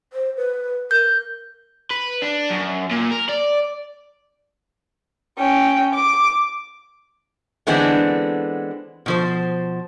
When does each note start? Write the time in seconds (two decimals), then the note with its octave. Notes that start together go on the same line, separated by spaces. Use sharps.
0.13 C5
0.37 B4
0.91 A#4 G6
1.91 B4
2.22 D4
2.50 F#2
2.91 A#2
3.11 A#4
3.29 D5
5.39 C#4 G5
5.94 D6
7.67 D3 E3 G#3 B3 C4 D4
9.06 B2 F3 C5